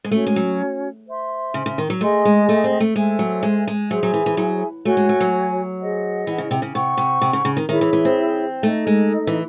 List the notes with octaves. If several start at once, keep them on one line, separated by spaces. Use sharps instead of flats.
G#3
A3 C#4 F#4 C#5
G#3
F#3
C5 E5 C6
C#3
C#3
D#3
F#3
A3 G#4 D#5 G#5 C6
G#3
A3
C4
A3
G#3 A4 C5 E5 G#5
F#3
G#3
G#3
F#3 G#4 C5 E5 G#5
F#3
E3
E3
F#3
A3 F#4 C#5 G#5
G#3
A3
F#3
G#4 C5 D#5 F#5
E3
C#3
C3
C#3
C3 C5 F#5 C#6
C3
C3
C#3
C#3
D#3
D#3 E4 G#4 C#5 E5
E3
E3
C4
A3 D#4 A4 D#5
G#3
E3